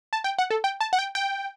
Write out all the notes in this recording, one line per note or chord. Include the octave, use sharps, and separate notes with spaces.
A5
G5
F#5
A4
G5
A5
F#5
G5
G5